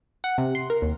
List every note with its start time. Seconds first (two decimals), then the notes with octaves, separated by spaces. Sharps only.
0.24 F#5
0.38 C3
0.55 C6
0.70 A#4
0.82 D#2